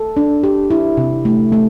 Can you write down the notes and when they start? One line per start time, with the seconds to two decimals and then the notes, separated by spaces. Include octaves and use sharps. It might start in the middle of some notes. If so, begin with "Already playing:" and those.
Already playing: A4
0.17 D4
0.44 G4
0.70 E4
0.97 C3
1.25 A3
1.52 A3